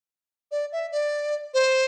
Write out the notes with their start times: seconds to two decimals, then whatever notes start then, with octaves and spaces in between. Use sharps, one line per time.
0.51 D5
0.72 E5
0.92 D5
1.54 C5